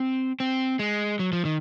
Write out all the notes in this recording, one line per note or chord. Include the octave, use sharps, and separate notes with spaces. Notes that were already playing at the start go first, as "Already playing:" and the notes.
Already playing: C4
C4
G#3
F#3
F3
D#3